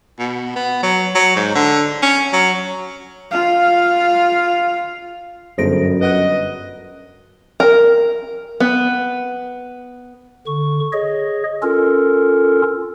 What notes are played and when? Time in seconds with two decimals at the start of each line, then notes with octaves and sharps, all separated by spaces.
0.19 B2
0.56 B3
0.83 F#3
1.15 F#3
1.36 G#2
1.55 D3
2.03 C#4
2.33 F#3
3.31 F4 F5
5.58 G1 F#2 G#4 A4 C5 A#6 D7
6.01 B4 D#5 F#5 F#6
7.60 A#4
8.60 B3
10.47 D3 C#6
10.93 G#4 C#5 D#5
11.63 C#4 F4 A4 A#4